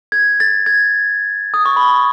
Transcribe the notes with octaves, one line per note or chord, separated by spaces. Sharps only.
G#6
A6
G#6
D#6
C#6
B5